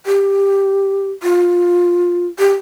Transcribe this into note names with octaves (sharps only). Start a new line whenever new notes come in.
G4
F4
G4